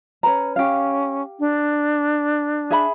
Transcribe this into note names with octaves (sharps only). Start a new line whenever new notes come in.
C#4 B4 A#5
C#4 G4 F5
D4
G#4 E5 B5